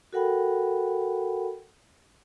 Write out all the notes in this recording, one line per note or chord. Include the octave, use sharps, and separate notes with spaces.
F#4 A4 A#4 F#5 G5 B5